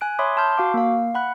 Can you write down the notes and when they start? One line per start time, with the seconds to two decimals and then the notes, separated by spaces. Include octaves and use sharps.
0.01 G#5 F#6 D7
0.19 C#5 E5 B5 C6 D6 D#6
0.37 A5 C6 F6 G6
0.58 F#4 F5 D6
0.74 A#3 F5
1.15 F#5 B5 F#6